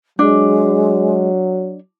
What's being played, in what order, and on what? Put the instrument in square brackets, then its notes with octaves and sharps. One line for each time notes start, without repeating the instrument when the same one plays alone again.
[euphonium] F#3 [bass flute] G#3 [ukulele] D4